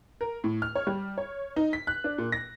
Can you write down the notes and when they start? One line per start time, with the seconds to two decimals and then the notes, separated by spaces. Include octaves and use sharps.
0.21 A#4
0.44 A2
0.62 F6
0.75 C#5
0.87 G3
1.18 C#5
1.56 D#4
1.73 B6
1.87 F#6
2.04 D4
2.18 A#2
2.32 A#6